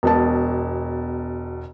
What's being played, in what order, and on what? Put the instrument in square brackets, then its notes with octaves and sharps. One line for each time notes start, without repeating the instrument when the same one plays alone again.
[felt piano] E1 B2 A5